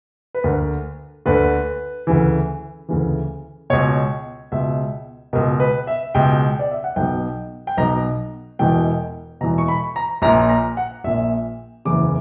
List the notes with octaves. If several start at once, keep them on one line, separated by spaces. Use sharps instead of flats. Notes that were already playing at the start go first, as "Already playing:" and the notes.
B4
D2 D3 A#4
D2 D3 B4
D2 C#3 E3
D2 C#3 E3
C#2 B2 C#5
C#2 B2 E5
C#2 B2 A#4
B4
E5
C#2 B2 G5
D5
E5
F#5
B1 B2 G5
G5
B1 B2 A#5
E1 E2 B2 G5
E1 E2 B2 A#5
C#6
B5
A#5
A#1 A#2 A#5
A#5
F#5
A#1 A#2 E5
F#1 E2 C#3 E3 D6